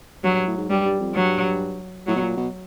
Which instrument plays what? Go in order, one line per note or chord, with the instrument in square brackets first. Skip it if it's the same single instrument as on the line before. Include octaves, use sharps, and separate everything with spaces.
[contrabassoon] G2 [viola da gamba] F#3
[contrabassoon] A2
G#2
[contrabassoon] G2 [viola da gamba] G3
[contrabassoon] G2
F2
[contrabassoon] G2 [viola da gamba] F#3
[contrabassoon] A2 [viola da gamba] F#3
[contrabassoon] B2
A#2
B2